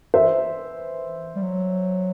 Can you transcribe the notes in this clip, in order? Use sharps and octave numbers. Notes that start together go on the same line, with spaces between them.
E3 C5 E5
G3
F#3